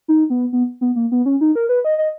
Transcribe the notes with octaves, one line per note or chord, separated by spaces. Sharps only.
D#4
B3
B3
B3
A#3
B3
C#4
D#4
A#4
B4
D#5
D#5